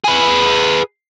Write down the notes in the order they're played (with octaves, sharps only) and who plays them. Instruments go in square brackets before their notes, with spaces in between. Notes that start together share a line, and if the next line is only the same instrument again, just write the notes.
[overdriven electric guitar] G#4 B4